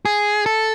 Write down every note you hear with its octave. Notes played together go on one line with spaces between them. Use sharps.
G#4
A4